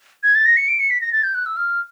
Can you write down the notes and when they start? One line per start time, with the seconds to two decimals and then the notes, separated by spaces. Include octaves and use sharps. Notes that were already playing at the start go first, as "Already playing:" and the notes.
0.23 G#6
0.35 A6
0.45 A#6
0.57 C#7
0.68 D7
0.79 C#7
0.90 B6
1.01 A#6
1.12 A6
1.24 G6
1.35 F#6
1.46 E6
1.57 F6